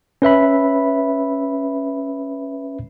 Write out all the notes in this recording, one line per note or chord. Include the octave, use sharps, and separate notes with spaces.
C#4 B4 E5 B5